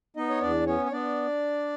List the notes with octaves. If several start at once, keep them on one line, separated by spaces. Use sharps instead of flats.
B3 D#4 D#5
C#5
E2 D4 D5
B3 C#4 C#5
C#5
B3 D4 D5